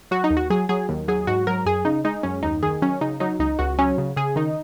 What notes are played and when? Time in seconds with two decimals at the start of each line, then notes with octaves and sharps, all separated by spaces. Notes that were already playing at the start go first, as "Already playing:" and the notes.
0.11 F#3 F#4
0.24 D#4
0.30 D#2
0.37 F#4
0.50 F#3 G#4
0.69 F#3 G#4
0.89 D#2
1.08 F#3 G#4
1.27 G#2 F#4
1.47 F#3 A#4
1.66 F#2 G#4
1.85 C#3 D#4
2.04 G#3 D#4
2.23 F#2 C#4
2.43 D#2 D#4
2.63 D#3 G#4
2.82 F#3 C#4
3.01 C#3 D#4
3.20 F#3 D#4
3.39 C#2 D#4
3.59 C#2 F#4
3.78 F#3 C#4
3.98 C#3
4.16 C#3 G#4
4.36 D#3 D#4